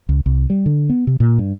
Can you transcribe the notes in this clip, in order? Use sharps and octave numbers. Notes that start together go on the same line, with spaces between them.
C#2
C2
G3
D3
B3
C3
A#2
G2